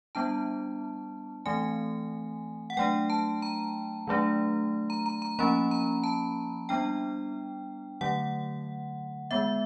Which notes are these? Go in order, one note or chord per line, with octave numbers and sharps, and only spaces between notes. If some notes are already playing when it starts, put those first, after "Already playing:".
G3 B3 D4 A5
E3 A3 C4 G#5
F#5
F#3 A3 D4 G5
A5
A#5
D#3 F#3 A3 D4
A#5
A#5
A#5
F3 A#3 C#4 B5
A#5
A5
G3 B3 D4 G5
D3 F#3 A3 F#5
D#3 G#3 B3 E5